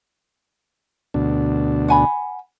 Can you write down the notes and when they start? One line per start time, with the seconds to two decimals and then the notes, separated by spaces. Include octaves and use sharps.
1.14 D2 B2 D4
1.88 F#5 G#5 B5